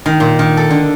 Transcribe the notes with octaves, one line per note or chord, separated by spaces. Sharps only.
D#3
A#2
D#3
A4
D3